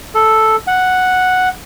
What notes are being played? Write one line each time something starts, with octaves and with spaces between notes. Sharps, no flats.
A4
F#5